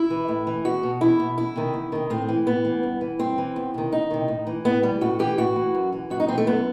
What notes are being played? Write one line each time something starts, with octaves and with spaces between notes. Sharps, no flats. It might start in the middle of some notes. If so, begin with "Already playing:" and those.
Already playing: E4
E3
A2
E3
E2 F#4
B2
E2 E4
B2
E2 E4
C3 D#3
E2
C3 D#3
A2 C4
E3
A2 B3
E3
G2
E3
G2 C4
E3
E2
C3 D#3
E2 D#4
C3 D#3
A2
E3
A2 B3
E3 G3
A2 F#4
E3 G4
A2 F#4
E3
F#2
E3
F#2 F#4
D#4
E3 C4
A3
F#2 B3